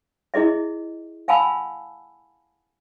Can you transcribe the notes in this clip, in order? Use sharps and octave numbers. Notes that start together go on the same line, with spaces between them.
E4 G#4 D#5 E5
F5 F#5 G#5 A5 B5 E6